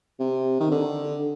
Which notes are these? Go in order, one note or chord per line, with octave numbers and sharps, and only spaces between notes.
C3
D#3
D3